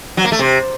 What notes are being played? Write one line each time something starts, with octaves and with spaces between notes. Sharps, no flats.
F#3
A#3
A3
C3